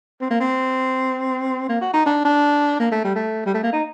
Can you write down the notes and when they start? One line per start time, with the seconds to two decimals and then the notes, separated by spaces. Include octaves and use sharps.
0.21 C4
0.31 A#3
0.40 C4
1.69 A#3
1.81 F#4
1.94 D#4
2.06 D4
2.25 D4
2.80 A#3
2.92 A3
3.04 G3
3.16 A3
3.46 G3
3.54 A3
3.63 A#3
3.73 D#4